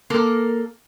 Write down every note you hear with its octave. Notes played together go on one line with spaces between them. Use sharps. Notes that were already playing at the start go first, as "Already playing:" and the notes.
A#3 A4 A#4